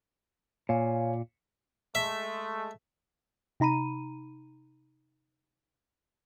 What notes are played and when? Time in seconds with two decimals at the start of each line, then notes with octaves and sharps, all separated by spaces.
0.69 A#2 C#5 F5 G#5
1.95 G#3 A3 E5
3.60 C3 D#4 A#5 B5 D#7